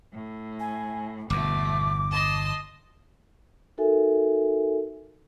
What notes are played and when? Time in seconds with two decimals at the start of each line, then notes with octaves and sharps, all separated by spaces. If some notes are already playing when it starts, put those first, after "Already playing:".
0.13 A2
0.60 G#5
1.30 G1 E2 B2 A3 D6
2.11 D#5 A5 C6
3.78 D#4 F#4 A4 A#4 E5 G#5